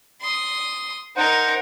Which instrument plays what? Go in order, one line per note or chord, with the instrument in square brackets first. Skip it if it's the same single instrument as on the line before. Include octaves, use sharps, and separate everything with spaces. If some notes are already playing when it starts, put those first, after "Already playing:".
[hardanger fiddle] C6 D#6
[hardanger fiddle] D#4 A#4 [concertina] C5 F#5